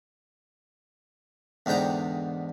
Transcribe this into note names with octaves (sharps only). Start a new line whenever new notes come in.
E2 G#2 D3 G5 A#5